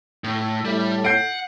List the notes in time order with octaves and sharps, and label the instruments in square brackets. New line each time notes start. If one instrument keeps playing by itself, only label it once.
[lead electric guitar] A2
[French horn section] A2 A3 [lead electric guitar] G3
[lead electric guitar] F#5 [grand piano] G6 C7 D7